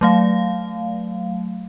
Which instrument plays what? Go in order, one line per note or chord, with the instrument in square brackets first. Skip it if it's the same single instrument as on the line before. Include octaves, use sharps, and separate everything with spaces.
[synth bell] F#3 A3 F5